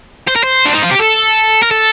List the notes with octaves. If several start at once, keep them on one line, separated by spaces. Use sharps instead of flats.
C5
A#4
C5
D4
D#4
F4
G4
A4
A#4
A4